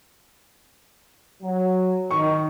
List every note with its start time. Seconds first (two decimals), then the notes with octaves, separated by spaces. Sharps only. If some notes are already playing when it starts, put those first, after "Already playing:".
1.41 F#3
2.11 D#3 C#6